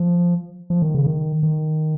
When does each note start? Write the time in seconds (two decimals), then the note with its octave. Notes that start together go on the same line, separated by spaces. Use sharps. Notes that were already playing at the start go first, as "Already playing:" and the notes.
Already playing: F3
0.70 F3
0.82 D#3
0.95 C#3
1.07 D#3
1.43 D#3